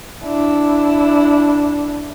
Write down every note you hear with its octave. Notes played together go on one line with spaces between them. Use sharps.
D4 E4